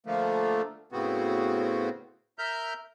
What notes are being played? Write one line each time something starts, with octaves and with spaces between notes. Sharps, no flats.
D3 F3 A3 A#3
A2 C#3 B3 C4 F#4
A#4 E5 F6 G6